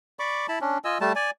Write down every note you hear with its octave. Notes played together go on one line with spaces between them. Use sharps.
D5 B5 C#6 D6
E4 A5 B5
C#4 D4
F4 D#5 G#5 E6
G3 A3 A5
D5 G#5